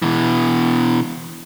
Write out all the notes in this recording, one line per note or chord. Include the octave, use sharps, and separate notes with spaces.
B2 E3